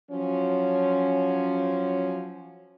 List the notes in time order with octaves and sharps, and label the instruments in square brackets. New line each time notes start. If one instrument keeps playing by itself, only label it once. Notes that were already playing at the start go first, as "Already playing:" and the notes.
[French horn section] F3 F#3 C#4